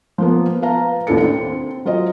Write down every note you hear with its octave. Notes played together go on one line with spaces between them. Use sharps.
F3 A#3 B3
B4 F5 A5 A#5
A1 D#2 D4 E4 A4 C#7
C4
F#3 F4 C5 D#5